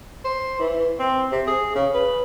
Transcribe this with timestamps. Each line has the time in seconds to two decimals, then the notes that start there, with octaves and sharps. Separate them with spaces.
0.25 C5
0.59 E3
0.99 C4
1.32 C3
1.47 G#4
1.75 C#3
1.94 B4